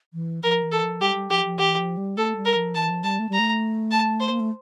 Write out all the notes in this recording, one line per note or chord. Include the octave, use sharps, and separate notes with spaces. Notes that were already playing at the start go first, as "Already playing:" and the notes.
E3
F3 A#4
E3
A4
F3
G3 G4
G3
F3 G4
F3
E3 G4
F3
G3
A3 A4
G3
A#4
F3
E3 A5
F3
G3 A5
A3
G3 A#5
A3
A5
C5
A#3
A3